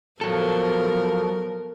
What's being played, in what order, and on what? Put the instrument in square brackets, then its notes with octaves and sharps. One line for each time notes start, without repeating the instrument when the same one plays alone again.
[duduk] F3 [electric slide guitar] F#3 A4 [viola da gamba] B3 A#4